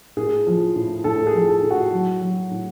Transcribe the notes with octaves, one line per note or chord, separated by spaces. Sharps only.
A2 G#4
F3
A2
A2 A4
G#4
F3
A4
A2
F#4
F#3
F#3
A2